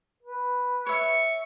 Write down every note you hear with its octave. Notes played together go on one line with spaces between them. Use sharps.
B4
C#5 E5 C#6